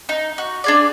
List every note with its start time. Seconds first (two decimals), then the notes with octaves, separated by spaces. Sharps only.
0.09 D#4
0.38 F#4
0.64 D4 G#4 D5